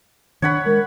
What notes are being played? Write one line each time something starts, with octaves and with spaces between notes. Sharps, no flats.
D#3 D4 C#5 F#5 B5
G#3 A#4